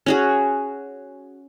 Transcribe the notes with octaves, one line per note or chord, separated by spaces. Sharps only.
C#4 F#4 G#4